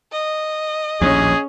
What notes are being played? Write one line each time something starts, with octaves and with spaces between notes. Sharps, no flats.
D#5
A#1 D#2 A2 C#4 G#4